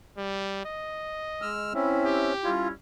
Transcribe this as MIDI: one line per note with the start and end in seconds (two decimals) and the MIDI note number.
0.18 0.64 55
0.66 1.59 75
1.42 1.73 56
1.42 1.73 88
1.42 1.73 89
1.74 2.33 60
1.74 2.33 61
1.74 2.31 64
1.74 2.31 76
2.05 2.51 67
2.44 2.70 55
2.44 2.70 61
2.44 2.70 64
2.44 2.68 65